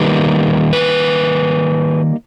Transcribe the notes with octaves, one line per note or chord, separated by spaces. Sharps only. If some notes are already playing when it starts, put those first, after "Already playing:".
Already playing: D#3 G3 A#3 D#4 B4
B4